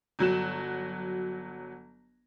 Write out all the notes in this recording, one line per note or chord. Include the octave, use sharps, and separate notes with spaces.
G1 F#3 F#4 E7